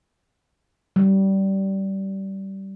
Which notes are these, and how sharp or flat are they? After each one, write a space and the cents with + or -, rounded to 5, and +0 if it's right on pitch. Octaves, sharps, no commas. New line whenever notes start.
G3 -20